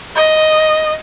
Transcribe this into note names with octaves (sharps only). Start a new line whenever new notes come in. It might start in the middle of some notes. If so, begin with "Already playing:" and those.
D#5